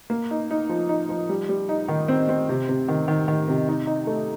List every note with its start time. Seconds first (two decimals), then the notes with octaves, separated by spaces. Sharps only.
0.10 A#3
0.31 D#4
0.51 D#4
0.69 F3
0.89 D#4
1.09 F3
1.29 G3
1.49 G3
1.69 D#4
1.88 D#3
2.08 C4
2.29 C4
2.49 C3
2.69 C3
2.88 D#3
3.08 D#3
3.28 D#3
3.48 C3
3.68 D#4
3.87 D#4
4.07 A3